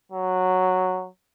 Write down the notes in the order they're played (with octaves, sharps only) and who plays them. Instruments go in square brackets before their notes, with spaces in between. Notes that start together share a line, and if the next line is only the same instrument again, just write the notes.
[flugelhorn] F#3